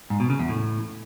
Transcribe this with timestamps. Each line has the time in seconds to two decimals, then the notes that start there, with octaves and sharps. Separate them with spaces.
0.10 G#2
0.20 B2
0.30 C#3
0.39 E2
0.49 A2